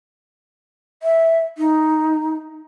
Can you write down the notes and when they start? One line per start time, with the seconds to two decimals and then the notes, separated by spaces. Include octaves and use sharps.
1.03 E5
1.58 D#4